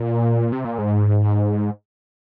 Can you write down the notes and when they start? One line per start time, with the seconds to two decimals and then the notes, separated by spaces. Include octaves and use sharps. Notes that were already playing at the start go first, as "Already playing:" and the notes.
Already playing: A#2
0.52 C3
0.65 A#2
0.78 G#2